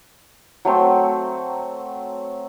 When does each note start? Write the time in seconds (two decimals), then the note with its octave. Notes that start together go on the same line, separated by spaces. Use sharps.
0.65 F#3 A3 C4